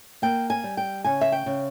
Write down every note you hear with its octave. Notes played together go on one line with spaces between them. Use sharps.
A#3 G5
G#5
G3
G5
C#3 G#5
E5
G5
C#3